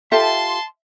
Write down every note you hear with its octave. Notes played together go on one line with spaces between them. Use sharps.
F4 G4 A4 E5 A5 C6